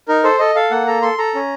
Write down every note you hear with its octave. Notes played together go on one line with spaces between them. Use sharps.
D#4 A#4
A4 C5
A4 D#5
A4 F5
A#3 F#5
A4 A#5
A4 C6
A4 A#5
C#4